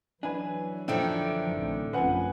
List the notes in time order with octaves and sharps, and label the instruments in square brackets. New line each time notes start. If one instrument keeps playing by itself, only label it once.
[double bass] E3 F#3 [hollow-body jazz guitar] D4 E4 B4 [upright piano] G#5
[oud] F#2 D3 D#3 [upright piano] F3 E4 G5 [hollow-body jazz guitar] D4
[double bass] A1 C3
[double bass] A1 F#2 [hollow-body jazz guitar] C#3 F3 C4 [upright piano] B4 F#5 G#5